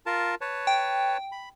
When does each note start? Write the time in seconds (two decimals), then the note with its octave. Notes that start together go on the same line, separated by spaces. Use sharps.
0.06 F4 A#4 A5
0.41 B4 C#5 A5
0.67 G5
1.32 B5